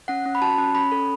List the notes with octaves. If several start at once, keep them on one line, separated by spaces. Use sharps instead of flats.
C#4 F#5
C#4
B5
F#4 A5
C#4
C#4 B5
A4